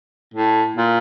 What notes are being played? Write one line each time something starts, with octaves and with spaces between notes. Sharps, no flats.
A2
A#2